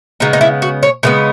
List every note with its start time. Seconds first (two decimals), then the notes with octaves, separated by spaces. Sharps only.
0.20 C#3 G#3 B3 D#4
0.33 D#4
0.41 E4
0.62 F#4
0.83 C#5
1.03 C#3 G#3 B3 B4